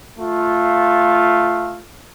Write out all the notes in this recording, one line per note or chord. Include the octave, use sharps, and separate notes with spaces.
A3 F4